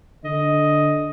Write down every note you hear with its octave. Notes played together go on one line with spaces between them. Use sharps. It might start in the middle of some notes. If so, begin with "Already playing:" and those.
D3 D#5